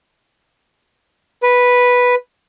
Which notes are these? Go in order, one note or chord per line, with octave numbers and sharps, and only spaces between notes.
B4